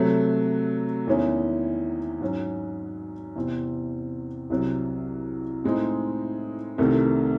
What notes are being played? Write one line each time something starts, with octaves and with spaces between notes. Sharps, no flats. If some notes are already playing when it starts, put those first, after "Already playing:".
Already playing: C3 F#3 A3
E2 D#3 G#3 C#4 E4
G#2 F#3 C#4
E2 C3 E3 C4
C2 C3 F#3
A2 G#3 C4 D#4
C2 C3 D#3 A3